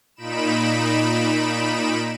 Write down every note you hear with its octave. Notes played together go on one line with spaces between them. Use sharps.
A#2 D#4 B5 D7 E7